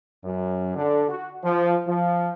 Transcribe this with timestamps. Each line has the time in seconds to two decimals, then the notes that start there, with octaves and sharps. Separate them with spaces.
0.24 F#2
0.75 D3
1.09 F#4
1.42 F3
1.87 F3